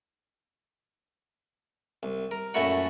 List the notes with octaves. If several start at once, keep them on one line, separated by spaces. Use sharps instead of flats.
C2
A#4
F#2 A#2 A3 E4 F#4 F#5